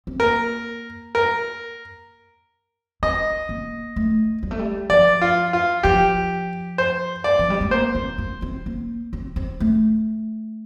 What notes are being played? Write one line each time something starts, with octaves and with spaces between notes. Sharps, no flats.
C4
A#3 A#4
A#4
C4 D#5
A#3
A3
G3
A3
G3
F3 D5
F4
F4
F3 G4
C5
D5
F3
G3
A3
A#3 C5
C4
A#3
C4
A#3
C4
C4
A3